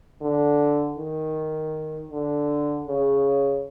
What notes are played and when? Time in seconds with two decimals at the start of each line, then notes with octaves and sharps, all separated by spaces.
0.21 D3
0.97 D#3
2.11 D3
2.87 C#3